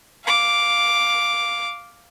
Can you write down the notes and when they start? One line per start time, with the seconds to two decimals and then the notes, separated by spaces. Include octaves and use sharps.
0.25 F5 D6